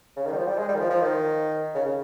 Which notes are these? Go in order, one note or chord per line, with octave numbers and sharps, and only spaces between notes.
C#3
D#3
G3
F3
G3
G#3
G3
D#3
F3
F3
D#3
C#3
C#3